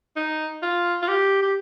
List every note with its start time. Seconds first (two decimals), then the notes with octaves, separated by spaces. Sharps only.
0.16 D#4
0.62 F4
1.02 F4
1.08 G4
1.42 G4